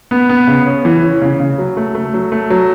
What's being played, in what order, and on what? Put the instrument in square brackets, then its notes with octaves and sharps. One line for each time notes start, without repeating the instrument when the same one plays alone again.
[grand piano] B3
B3
C#3
C#4
E3
C#4
C#3
C#3
F#3
A3
A3
F#3
A3
F#3